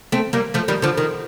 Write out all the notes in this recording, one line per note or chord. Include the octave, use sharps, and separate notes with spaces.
A3 C4
G3 A#3
F3 A3
D#3 G3
D3 F3
D#3